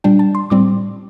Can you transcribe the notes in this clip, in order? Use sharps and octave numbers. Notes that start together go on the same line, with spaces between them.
A#2 G3 D4 G5
A5
C6
A2 G3 C4 D6